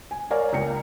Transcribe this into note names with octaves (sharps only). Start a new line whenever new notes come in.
G#5
A#4 C#5 D5 F5 G#5 A#5
C#2 A#3 G5 A#5 C#7